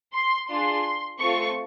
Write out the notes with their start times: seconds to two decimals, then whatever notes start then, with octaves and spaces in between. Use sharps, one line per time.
0.14 C6
0.49 D4 F4 G#4 C6
1.19 A3 C4 F4 A4 C#6